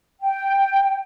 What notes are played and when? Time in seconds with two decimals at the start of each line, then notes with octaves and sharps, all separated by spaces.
0.20 G5